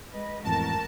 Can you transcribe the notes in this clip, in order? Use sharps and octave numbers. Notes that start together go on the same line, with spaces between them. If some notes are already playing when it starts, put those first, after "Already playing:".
G#3 B4 D#5
A1 F2 A2 F#4 A#4 A5